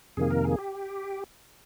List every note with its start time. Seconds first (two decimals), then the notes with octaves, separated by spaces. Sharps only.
0.17 F2 C3 D#3 A#3 G#4
0.31 A#4
0.44 G#4
0.58 G4